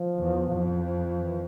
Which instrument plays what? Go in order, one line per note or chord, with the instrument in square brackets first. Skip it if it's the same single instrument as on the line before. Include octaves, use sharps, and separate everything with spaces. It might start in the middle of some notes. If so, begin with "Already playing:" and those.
Already playing: [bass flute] F3
[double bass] E2
F2
[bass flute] E3